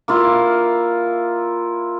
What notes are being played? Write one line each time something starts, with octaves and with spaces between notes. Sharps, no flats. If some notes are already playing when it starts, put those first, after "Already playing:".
A#3 E4 F4